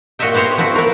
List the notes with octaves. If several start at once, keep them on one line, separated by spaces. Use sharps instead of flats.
A#2 F#4 C#5 D#5 E5 G5
B3 G4 C5 C#5
F3 B3 C4 E4 F#4
B3 A#4